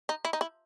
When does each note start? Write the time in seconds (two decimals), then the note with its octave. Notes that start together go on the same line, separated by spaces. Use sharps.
0.09 D#4
0.25 E4
0.33 D#4
0.41 E4